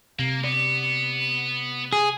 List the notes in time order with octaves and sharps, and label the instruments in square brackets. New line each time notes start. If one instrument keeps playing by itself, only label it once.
[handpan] C3 [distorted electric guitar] A#3
[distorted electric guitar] B3 [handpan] D5
[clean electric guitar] G#4